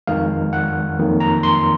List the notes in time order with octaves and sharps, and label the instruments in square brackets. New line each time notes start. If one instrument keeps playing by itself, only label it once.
[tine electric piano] F2 D#3 G#3 F5
F#5
F2 D#3 F#3 A#3
A#5
C6